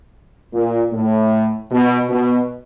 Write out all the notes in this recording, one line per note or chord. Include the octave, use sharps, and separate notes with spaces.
A#2
A2
B2
B2